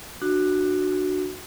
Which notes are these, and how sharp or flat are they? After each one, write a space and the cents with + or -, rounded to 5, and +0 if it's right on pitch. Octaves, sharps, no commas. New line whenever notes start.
D4 +30 F#4 +0